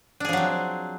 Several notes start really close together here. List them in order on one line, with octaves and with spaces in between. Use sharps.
D4 G#4 F3 F#3 C4